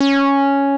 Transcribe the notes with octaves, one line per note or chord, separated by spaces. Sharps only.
C#4